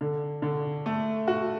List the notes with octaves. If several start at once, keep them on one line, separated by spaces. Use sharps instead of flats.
D3
D3
A3
F#4